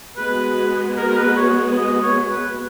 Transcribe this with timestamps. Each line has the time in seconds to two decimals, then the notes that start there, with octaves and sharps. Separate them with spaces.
0.17 G#3 B3 F#4 B4
0.97 A#4
1.09 A#4
1.17 B4
1.37 C#5
1.76 D#5
2.03 C#5
2.29 B4